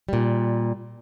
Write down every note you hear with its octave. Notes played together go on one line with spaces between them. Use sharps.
A#2 G3